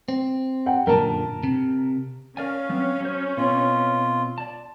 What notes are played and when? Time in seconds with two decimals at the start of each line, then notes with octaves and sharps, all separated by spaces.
0.08 C4
0.66 F#5 G5
0.87 F#2 A#2 D3 A#4 A5
1.43 C3
2.37 C#4 A#4 D5 F5 G#5
2.69 F#3 B3 C4
3.00 F#3 C5
3.37 B2 C4 F4
4.38 D5 A5